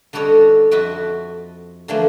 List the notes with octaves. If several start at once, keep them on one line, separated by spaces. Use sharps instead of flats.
D3 G3 F#4 A4 C#5 D#5
F2 F#4 D#5 E5 A5
D3 E3 F3 A3 A#3